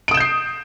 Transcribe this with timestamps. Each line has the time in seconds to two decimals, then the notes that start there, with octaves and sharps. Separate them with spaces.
0.08 D7
0.11 D#6
0.14 E7
0.17 G6
0.20 C7